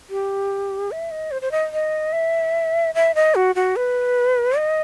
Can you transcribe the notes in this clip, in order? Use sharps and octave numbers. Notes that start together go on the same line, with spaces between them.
G4
E5
D#5
C5
C5
D#5
D#5
E5
E5
D#5
F#4
F#4
B4
D#5